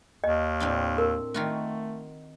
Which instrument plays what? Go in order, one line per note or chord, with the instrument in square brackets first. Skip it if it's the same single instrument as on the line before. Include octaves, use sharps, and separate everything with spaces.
[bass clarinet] D#2 [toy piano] D#5
[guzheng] A2 C4 D4
[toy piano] A#4
[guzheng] D#3 F4 F#4 [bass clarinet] A3